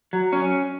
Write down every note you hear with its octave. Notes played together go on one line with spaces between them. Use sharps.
F#3
C#4